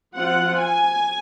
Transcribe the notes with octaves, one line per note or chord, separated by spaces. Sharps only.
F3 C4 F4 F#5
G#5